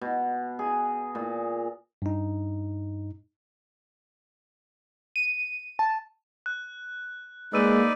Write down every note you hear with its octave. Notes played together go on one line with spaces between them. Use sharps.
B2
G#4
A#2
G2 D#4
D#7
A5
F#6
G#3 A#3 D#4 B4 D5 E6 D#7